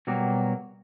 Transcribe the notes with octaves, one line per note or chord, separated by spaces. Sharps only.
B2 F#3 G3 A#3 F#4